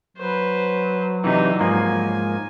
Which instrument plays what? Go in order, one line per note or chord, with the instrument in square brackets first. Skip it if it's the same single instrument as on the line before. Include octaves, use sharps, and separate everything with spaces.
[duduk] F#3 [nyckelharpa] B4 C5
[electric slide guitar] C3 E3 [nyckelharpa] D4 D#4
[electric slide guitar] G#2 F3 A#3 [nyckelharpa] G#5